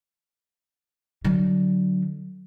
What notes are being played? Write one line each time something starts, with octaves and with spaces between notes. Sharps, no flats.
D3 F#3